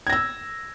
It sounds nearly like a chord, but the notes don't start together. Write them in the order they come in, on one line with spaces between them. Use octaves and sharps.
G#6 A#6 E6